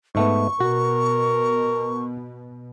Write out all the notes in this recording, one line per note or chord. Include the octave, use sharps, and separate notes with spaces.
G#2 A3 B3 C#6
B2 F#4 A#4